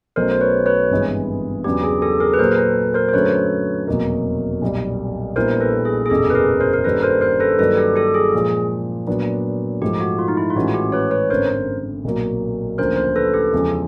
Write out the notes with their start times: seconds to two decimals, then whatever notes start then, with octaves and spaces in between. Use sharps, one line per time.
0.16 B1 B2 F#3 A3 C#4 A#4 C5
0.31 C5
0.41 B4 C#5
0.66 B4 C#5
0.91 G#1 G2 E3 G#3 B3
1.64 E2 C#3 F#3 B3 D4 G4
1.83 G#4
2.02 G4 A4
2.20 G#4 A#4
2.34 B4
2.39 A#2 F#3 A#3 A#4 C5
2.52 A#4
2.57 A4 B4
2.94 A#4 C5
3.09 C5
3.13 F#2 D3 F#3 A3 B4 C#5
3.87 F1 E2 B2 F#3 A#3
4.62 B1 A#2 G3
5.36 A#1 A#2 G3 B3 E4 A#4 C5
5.60 A4 B4
5.85 G#4
6.06 G#4
6.10 F#1 E2 B2 G4 A4
6.30 B4
6.35 G#4 A#4
6.60 A#4 C5
6.73 A#4
6.84 G2 D#3 G3 A#3 C#4 A4 B4
7.03 A#4 C5
7.21 A#4 C5
7.40 A4 B4
7.59 G2 D#3 F#3 A#3 D4 A4 B4
7.77 G4 A4
7.96 G4 A4
8.14 G#4
8.33 A#2 F3 G#3
9.07 A#2 F#3 B3 D4
9.82 G#2 F3 A3 G4
10.00 F#4
10.19 F4
10.28 D#4
10.37 E4
10.50 F4
10.56 A1 A2 E3 G#3 C#4 F#4
10.68 F#4
10.74 G4
10.92 B4 C#5
11.11 B4 C#5
11.30 G#1 F#2 D3 A#4 C5
12.04 B1 A#2 F#3 A#3
12.78 D2 C#3 F3 A#3 A#4 C5
12.97 A#4 C5
13.16 A4 B4
13.34 G4 A4
13.53 E2 C#3 F3 G#3